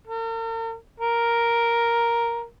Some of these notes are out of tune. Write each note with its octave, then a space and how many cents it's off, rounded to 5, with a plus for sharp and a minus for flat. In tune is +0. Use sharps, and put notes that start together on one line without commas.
A#4 -45
A#4 +5